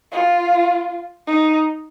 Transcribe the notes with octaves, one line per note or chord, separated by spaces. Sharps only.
F4
D#4